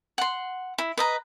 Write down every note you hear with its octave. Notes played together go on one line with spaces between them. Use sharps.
F#5 C6
E4
B4 D#5 A#5